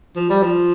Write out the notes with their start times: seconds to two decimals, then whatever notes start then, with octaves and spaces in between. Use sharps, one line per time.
0.16 F3
0.30 G3
0.43 F3